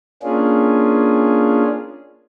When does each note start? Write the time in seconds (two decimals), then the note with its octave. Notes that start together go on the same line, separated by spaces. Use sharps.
0.23 A#3 C#4 D4 F4 G#4